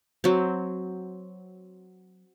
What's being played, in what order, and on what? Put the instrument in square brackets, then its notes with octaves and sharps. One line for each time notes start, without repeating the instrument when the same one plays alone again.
[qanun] F#3 C4